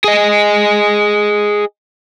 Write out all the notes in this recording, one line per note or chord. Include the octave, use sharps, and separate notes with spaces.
G#4 D#5